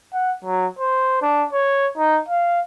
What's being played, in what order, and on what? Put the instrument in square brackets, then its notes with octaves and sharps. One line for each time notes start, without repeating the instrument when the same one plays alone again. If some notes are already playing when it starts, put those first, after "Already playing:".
[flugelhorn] F#5
F#3
C5
D4
C#5
D#4
F5